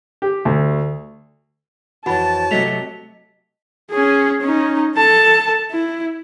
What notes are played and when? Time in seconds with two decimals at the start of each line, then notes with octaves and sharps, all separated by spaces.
0.22 G4
0.45 D2
2.06 F2 E3 F#4 C#5 F#5 A5 B5 A6
2.51 C3 F#3 A3 D#5 B6 F7
3.91 C#4 G#4
4.41 C#4 D#4
4.96 A4 A5
5.71 E4